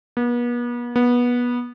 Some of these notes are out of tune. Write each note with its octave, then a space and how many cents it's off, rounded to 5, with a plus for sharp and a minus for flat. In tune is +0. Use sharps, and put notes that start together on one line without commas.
B3 -40
B3 -20